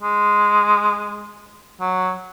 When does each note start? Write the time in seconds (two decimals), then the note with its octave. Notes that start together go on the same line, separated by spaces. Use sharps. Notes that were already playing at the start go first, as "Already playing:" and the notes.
0.02 G#3
1.81 F#3